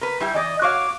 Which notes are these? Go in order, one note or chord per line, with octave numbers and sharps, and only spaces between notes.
A#4 B4
G3 E4 G4
E3 D5 D#5
F#4 C#5 F5 D6